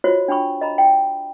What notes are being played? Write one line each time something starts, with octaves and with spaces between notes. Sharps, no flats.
F4 F#4 C5 C#5 D#5
D4 G5 B5 C#6
D#5 A#5 B5
G5